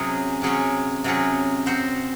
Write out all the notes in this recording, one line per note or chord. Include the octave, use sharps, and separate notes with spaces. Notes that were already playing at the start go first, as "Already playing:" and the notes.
Already playing: C3 F#3 C#4 G#4
C3 F#3 C#4 G#4
C3 F#3 C#4 G#4
C4 F#4 C5